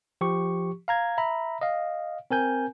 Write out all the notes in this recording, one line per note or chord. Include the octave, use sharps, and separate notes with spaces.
F3 G4 C#6
F5 A#5 G#6
E5 A#5 B5
D#5 F5
C4 A#4 G#5 G6